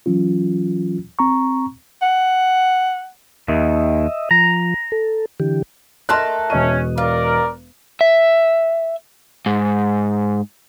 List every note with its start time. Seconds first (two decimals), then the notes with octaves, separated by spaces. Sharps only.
0.06 E3 F#3 C#4 F4
1.19 C4 A#5 C#6
2.02 F#5
3.48 D#2 D#3 D#5 E5
4.31 F3 A#5
4.92 A4
5.40 D3 E3 G4
6.09 A3 A#4 D#5 A5 C6 F#6
6.50 E1 C#4 D#5 D#7
6.98 F4 A#4 D5
8.01 E5
9.46 G#2